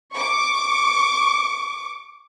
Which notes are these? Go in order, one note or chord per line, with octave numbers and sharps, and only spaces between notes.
C#6 D6